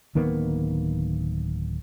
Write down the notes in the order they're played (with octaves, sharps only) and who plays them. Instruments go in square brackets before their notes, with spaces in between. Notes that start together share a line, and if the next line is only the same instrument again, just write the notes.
[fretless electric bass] D1 D#3 A#3 B3